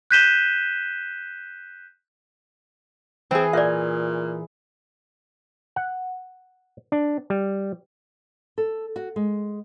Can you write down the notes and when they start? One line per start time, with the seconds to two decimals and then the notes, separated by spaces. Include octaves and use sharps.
0.11 F#6 G6 B6 D#7 E7 G7
3.31 E3 C4 G#4
3.53 A#2 D5 E5
5.76 F#5
6.92 D4
7.30 G3
8.58 A4
8.96 F#4
9.16 G#3